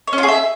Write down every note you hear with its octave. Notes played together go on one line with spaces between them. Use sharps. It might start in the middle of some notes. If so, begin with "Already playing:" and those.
C#5
C#4
F4
G#4
E5